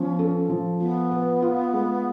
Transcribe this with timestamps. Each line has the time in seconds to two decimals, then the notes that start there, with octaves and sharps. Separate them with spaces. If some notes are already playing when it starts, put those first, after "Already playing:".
Already playing: F3 B3 C#4
0.19 A4
0.49 F3
0.80 B3 F4
1.11 B4
1.42 F4
1.73 G#3